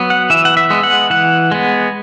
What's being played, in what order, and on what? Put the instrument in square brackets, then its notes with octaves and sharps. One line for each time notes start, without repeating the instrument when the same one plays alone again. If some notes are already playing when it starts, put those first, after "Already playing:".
Already playing: [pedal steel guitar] F#3 B3
F#5
E3 E5
F#5
E5
G#3 B3
F#5
E3 F#5
G#3 B3